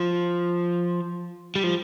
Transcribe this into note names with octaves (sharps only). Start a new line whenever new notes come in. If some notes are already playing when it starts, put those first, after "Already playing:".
Already playing: F3
G3
F3